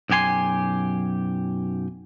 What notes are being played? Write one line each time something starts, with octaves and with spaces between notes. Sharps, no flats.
B1 F#2 G4 G#5 C6